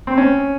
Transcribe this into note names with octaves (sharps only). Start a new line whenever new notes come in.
C4
C#4